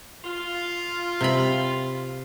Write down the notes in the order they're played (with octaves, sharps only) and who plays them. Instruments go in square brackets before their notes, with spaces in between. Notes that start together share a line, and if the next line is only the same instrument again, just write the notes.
[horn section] F4
[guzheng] C3 B5